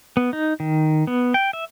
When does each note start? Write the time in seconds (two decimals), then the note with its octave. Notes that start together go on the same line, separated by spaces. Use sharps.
0.17 B3
0.33 D#4
0.60 D#3
1.07 B3
1.34 G5
1.53 E5